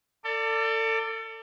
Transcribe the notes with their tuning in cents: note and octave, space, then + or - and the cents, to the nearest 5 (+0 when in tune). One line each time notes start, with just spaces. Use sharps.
A4 +35 D5 +0